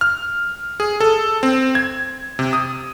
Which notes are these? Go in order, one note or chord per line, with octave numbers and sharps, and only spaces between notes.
F6
G#4
A4
C4
G#6
C3
D#6